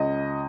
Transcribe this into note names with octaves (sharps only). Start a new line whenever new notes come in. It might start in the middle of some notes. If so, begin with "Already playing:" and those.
Already playing: C#2 D#5